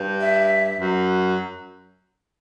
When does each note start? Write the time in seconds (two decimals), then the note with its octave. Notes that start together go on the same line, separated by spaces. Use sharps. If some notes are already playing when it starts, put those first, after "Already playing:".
Already playing: G2
0.20 E5
0.80 F#2